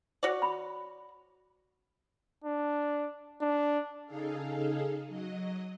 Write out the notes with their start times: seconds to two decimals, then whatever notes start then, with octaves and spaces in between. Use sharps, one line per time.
0.23 F#4 C#5 D5
0.42 B5
2.44 D4
3.42 D4
4.06 C#3 D#4 G#4 A4 F5
5.07 F#3 D#5